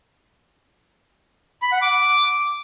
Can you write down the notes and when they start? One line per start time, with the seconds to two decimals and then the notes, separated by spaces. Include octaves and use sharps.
1.62 B5
1.72 F#5
1.82 D6